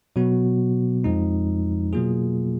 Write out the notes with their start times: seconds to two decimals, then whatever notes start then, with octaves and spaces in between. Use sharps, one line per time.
0.16 B2 F#3 B3 F#4
1.04 F2 F3 G#3 D#4
1.93 B2 F#3 A#3 F4 G#4